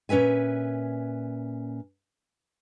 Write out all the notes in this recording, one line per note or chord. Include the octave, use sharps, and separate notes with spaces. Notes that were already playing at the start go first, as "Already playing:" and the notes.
A#2 C#4 B4 E5 G#5